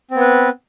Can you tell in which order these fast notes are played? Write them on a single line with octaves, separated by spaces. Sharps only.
C4 B3 B4